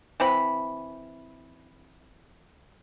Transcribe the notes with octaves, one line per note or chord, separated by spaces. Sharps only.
E3 C4 B5